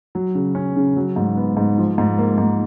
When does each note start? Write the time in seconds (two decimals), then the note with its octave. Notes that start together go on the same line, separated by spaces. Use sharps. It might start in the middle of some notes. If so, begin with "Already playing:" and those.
0.15 F#3
0.35 C#3
0.55 C#4
0.76 C#3
0.96 F#3
1.16 G#2
1.37 B3
1.57 G#2
1.78 F3
1.98 G#2
2.18 A#3
2.38 G#2